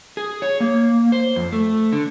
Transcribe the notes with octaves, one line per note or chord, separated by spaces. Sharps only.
G#4
C#5
A#3
C5
F2
A3
D3